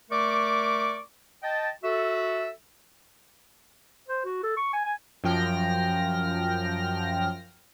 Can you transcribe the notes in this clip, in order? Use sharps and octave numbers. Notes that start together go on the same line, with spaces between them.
A3 A#4 D5 C#6 D6
D#5 G5 A5
F#4 A4 E5
C5
F#4
A4
C#6
G#5
G#5
F#2 F3 G5 F6 A#6